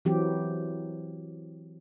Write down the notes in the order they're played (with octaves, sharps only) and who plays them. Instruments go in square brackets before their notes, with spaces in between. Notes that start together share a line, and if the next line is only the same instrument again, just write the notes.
[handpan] E3 F#3 C4 G4